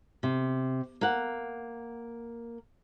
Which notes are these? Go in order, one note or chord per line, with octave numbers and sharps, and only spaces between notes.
C3
A#3 F#5